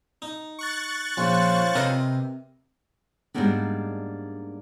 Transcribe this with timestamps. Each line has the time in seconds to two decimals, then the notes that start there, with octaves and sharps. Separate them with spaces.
0.22 D#4
0.59 C#6 F#6 A6
1.17 A#1 C#4 F4 C5
1.75 C3 A#4 B4 D#5
3.34 G#2 E3 G3 A#3 B3 D4